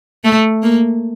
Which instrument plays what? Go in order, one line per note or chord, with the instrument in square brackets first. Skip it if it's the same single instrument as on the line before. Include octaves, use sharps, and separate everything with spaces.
[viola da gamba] A3
A#3